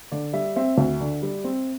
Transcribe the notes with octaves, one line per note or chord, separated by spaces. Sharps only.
D3 D5
G3 E5
C4 E5
D2
D3
G3
C4